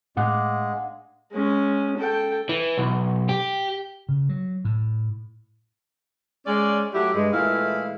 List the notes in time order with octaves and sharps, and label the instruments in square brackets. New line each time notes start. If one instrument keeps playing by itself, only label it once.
[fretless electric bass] A2 [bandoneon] G#3 [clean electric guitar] D4 F5 F#5
[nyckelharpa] G#3 C#4
A4 G5
[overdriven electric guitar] E3
B1
G4
[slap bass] C#3
F#3
A2
[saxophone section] G#3 C#4 D5
F#3 A3 E4 G4
G2 G#3
A#2 E3 G#3 A3 E4 F5